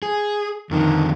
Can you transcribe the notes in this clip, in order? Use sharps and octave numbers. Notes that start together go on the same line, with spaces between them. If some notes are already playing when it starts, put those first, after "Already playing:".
G#4
F2 D3 D#3